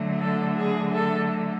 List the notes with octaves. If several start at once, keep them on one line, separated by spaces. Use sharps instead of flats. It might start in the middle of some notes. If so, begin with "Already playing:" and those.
Already playing: D3 F#3 A3
A4
G#4
A4